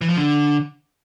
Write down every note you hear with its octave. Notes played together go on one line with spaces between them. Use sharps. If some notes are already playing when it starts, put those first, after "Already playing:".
E3
F3
D3